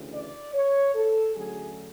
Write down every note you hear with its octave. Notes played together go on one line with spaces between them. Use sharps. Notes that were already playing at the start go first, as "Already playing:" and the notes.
Already playing: D2 C#3 E3
D5
C#5
A4
D2 D3 F#3 A3 C#4 G#4